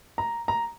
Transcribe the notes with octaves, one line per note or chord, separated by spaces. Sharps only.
A#5
A#5